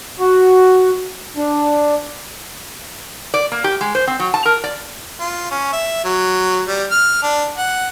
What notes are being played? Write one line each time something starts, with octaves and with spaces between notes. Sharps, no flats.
F#4
D4
D5
A#3
G4
G#3
C5
C4
F#3
A5
A#4
D5
F4
C#4
E5
F#3
G3
F6
D4
F#5